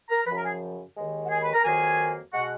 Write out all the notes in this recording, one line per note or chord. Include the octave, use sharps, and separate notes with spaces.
A#4 A#5
F#2 C#3 F3 B4 B5
A#4 A#5
G#4 G#5
D#2 D#3 G#3
F#5
G#4 G#5
B4 B5
A#4 A#5
F2 D#3 F#3 A#3 G#4 G#5
B2 G#3 F#4 F#5